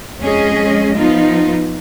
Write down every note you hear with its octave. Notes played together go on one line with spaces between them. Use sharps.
F2 G#3 C#4 G#4 D#5
F3 B3 D#4 F4